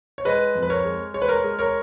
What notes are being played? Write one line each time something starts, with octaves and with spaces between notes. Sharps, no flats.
C#5
G#3 B4 D#5
F2
B4
A#4 C#5
G#3
G#3 C#5
B4
A#4 C#5
G#3
A#4 C#5